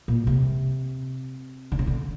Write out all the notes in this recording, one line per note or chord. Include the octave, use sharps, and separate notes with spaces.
A#2
C3
D3
C#3
D3